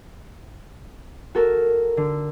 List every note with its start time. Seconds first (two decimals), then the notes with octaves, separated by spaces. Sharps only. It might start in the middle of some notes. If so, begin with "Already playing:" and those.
1.35 F#4 A4 A#4
1.97 D3